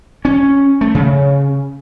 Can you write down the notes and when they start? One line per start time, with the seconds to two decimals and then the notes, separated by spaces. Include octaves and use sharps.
0.25 C#4
0.81 A3
0.95 C#3